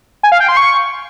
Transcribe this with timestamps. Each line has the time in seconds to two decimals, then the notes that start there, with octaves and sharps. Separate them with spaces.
0.23 G#5
0.32 F5
0.40 G5
0.48 C6
0.57 C#6